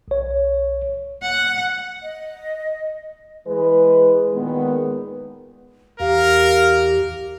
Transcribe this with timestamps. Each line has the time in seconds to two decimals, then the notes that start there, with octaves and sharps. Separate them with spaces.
0.08 B1 C#5
1.22 F#5
2.02 D#5
3.46 E3 G#3 B4
4.34 A#2 D#3 G#3 B3
6.00 E2 G4 A#4 F5